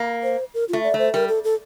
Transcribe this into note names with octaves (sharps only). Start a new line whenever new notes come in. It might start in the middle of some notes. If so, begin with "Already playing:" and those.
Already playing: A#3
C5
A#4
A3 F4
D5
A3 C5
G3 A#4
A4
A4